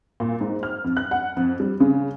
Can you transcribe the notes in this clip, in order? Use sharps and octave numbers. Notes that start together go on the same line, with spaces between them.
A#2
G#2
F6
F2
F#6
F#5
F2
G3
C#3